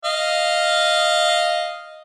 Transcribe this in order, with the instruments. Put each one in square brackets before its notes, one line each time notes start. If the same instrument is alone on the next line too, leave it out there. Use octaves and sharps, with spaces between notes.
[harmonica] D#5 F5